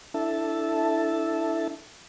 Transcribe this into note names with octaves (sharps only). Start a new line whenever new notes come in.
D4 E4 A4 E5 A5